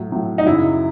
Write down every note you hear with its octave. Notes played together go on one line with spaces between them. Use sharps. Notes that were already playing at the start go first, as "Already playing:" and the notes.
Already playing: A2 F#3
A2 F#3
D#4
F#2 C#3 F#3 E4